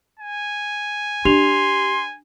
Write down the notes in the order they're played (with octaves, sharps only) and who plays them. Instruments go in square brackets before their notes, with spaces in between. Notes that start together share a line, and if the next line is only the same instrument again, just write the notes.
[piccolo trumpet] G#5
[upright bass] D4 [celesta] G4 F7 [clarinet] C6